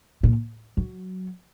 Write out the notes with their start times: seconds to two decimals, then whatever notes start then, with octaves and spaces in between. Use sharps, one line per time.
0.23 A#2
0.77 F#3